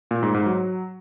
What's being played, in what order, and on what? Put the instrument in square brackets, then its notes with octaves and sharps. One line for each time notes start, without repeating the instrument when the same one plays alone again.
[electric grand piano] A#2
G#2
G#2
F#3